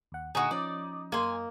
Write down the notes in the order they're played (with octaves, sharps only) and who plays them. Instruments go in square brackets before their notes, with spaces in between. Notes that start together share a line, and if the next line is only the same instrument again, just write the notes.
[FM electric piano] D#2 F#5
[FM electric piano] A#2 D3 C#6 [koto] D#4 [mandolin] F#4 G#4
[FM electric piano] F3 C#4 [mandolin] D5
[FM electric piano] F#2 [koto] A#3 [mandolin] G#5 C6